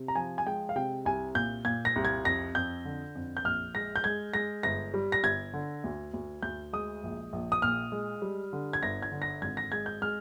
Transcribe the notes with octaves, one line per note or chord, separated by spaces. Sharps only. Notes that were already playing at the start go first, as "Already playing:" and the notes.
Already playing: C3
A#5
F3 G#5
G#5
G#3 G5
F5
C3 G5
C2 G#5
A#2 G6
A#2 G#6
A#6
C2
G#6
F2 A#6
F2 G6
D3
F2
G6
A#1 F6
G#3 A#6
G6
G#3 G#6
G#3 A#6
G1 A#6
G3
A#6
G1 G#6
D3
D2
D2
D2 G6
G#3 D#6
A#1
A#1
D#6
A#2 F6
G#3
G3
D3
G#6
G1 A#6
G#6
D3
A#6
G#1 G#6
A#6
G#3 G#6
G6
G#3 F6